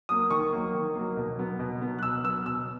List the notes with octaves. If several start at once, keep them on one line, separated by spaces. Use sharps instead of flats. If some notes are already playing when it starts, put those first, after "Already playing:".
F#3 A#3 D#6
D#3 C#6
F#3 A#3
D#3
F#3 A#3
B2
F#3 B3
B2
F#3 B3
F#6
B2 E6
F#3 B3 E6
B2 E6